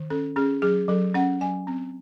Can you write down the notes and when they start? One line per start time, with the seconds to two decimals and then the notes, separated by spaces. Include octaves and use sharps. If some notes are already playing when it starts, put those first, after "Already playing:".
Already playing: D#3
0.10 C#4 A4
0.36 C#4 G#4
0.62 F#3 G#4
0.88 F#3 A4
1.14 C#4 F#5
1.41 F#3 G#5
1.67 C4